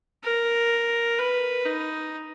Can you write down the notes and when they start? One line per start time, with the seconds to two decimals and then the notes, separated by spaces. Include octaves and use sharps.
0.24 A#4
1.18 B4
1.66 D#4